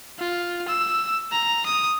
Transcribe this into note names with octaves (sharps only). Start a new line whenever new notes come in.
F4
E6
A#5
D#6